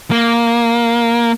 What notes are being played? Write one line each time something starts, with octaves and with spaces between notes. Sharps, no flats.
A#3